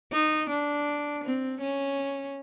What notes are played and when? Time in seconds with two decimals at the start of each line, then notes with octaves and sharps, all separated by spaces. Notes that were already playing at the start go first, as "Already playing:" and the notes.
0.12 D#4
0.50 D4
1.24 C4
1.61 C#4